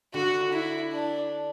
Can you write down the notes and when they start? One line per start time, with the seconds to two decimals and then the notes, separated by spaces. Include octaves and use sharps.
0.14 D3 F#4
0.52 E4
0.92 D4